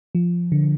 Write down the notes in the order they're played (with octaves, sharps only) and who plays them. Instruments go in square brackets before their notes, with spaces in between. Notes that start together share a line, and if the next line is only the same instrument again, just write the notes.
[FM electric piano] F3
D3